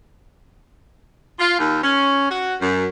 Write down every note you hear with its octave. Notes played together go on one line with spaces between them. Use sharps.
F4
D#2
C#4
F#4
F#2